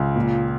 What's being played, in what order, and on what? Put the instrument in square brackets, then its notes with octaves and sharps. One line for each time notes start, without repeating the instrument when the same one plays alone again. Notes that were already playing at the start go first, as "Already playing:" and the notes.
Already playing: [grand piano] C#2
A#2